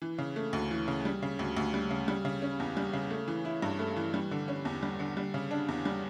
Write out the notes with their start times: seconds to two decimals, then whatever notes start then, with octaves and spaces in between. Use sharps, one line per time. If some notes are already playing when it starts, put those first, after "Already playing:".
0.02 E3
0.18 C#3
0.36 A3
0.53 D2
0.71 E3
0.88 C#3
1.05 G3
1.22 C#3
1.39 D2
1.57 D2
1.74 G3
1.91 C#3
2.08 G3
2.25 C#3
2.42 C#4
2.60 E2
2.77 G3
2.93 C#3
3.10 A3
3.28 E3
3.45 E4
3.62 G2
3.79 A3
3.96 E3
4.14 G3
4.31 D3
4.48 C#4
4.65 E2
4.83 G3
4.99 D3
5.17 G3
5.34 C#3
5.51 D4
5.68 E2
5.85 G3